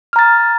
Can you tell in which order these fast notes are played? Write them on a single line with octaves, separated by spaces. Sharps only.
F6 A#5 A6